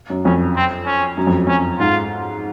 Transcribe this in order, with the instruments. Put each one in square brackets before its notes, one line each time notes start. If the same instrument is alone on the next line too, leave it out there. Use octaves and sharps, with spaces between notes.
[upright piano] F#2
[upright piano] F2 [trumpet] C#4
[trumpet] C4
C#4
[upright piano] F#2
F2
[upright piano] F2 [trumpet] C#4
[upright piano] G#2 [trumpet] F4